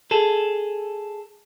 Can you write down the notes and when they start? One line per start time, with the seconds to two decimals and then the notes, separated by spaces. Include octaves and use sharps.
0.11 G#4 A4